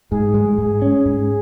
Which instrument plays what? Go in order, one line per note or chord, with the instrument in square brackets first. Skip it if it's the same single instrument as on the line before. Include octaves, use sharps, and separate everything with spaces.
[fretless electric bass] G#2 [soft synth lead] G#4
[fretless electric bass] G#3
G#2
C#4
G#2